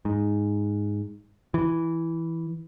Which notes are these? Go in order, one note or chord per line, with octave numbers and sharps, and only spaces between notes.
G#2
E3